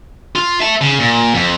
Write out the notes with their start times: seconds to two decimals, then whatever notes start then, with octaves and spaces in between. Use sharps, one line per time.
0.36 F4
0.60 E5 A5
0.81 C#3
0.99 A#2
1.35 F2